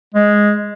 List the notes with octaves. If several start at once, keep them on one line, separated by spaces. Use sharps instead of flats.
G#3